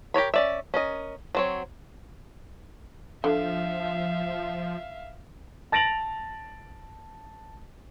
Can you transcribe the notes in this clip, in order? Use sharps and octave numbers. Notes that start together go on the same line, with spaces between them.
G4 A#4 C#5 B5
C#4 D5 E5
C#4 A#4 D#5
F#3 C4 C#5
D3 F3 E5 F5
A5 A6 A#6 D7 F7 F#7